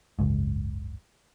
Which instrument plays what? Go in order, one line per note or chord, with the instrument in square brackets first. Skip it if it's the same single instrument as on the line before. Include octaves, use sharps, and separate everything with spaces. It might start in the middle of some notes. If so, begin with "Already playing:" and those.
[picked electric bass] F#1 C#2 G#2